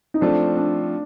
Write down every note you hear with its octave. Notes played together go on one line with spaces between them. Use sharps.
D#4
F3 A3 C4 D4 F4 A4
D4